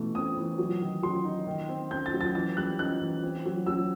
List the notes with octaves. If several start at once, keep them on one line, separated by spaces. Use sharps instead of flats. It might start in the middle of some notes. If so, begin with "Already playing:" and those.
Already playing: B2 E3 A3
C4 D#6
E3
F#3
D#3
F#3 C6
D#4
D#3
C4
C4 G6
A6
F#3
A6
E3 A6
G3 F#6
D#4 F#6
E3
C4
F#3
F#3 E6